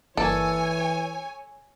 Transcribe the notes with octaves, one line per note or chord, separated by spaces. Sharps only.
G1 E3 A#3 A4 C#5 D5 G#5